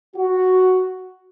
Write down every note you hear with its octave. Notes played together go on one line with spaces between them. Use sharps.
F#4